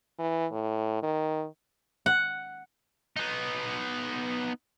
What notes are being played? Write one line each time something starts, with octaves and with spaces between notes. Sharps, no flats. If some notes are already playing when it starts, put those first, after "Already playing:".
E3
A2
D#3
F#5
B3 D#4